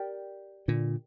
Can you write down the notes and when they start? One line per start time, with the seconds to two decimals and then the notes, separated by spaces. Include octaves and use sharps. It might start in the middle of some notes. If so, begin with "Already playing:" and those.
Already playing: G4 A#4 D5 G5
0.68 A#2 D3